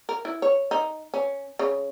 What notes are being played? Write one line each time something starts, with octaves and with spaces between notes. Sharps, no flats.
A#4
E4
C#5
D#4
C#4
C#3